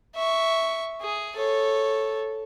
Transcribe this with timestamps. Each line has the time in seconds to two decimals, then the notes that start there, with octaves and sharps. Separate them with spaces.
0.15 E5 C#6
1.01 G#4
1.36 A4 C#5